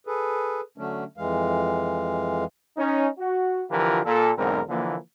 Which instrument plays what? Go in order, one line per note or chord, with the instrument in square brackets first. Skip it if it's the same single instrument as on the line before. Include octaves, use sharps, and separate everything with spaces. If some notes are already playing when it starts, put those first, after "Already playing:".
[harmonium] G#4 A4 B4
D3 F#3 A3 C#4 D4
F2 E3 G#3 F5
[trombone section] C#4 D#4
F#4
D3 E3 F3 F4 G4 A#4
A#2 A4
B1 E2 G#2 D3 C4 A#4
D3 E3 F3 A#3